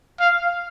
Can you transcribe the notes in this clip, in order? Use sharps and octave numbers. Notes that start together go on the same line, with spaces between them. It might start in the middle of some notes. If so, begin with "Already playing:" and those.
F5